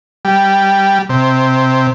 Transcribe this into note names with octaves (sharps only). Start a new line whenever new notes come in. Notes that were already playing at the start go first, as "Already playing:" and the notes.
G3
C3